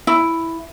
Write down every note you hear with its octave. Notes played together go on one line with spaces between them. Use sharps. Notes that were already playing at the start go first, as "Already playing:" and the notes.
E4